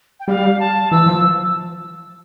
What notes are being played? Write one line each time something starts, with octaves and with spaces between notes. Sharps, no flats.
G5
G3 F5
A5
E3 E6
F3